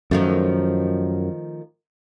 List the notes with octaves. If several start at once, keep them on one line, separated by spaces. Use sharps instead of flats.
F#2 D#3 F3 A3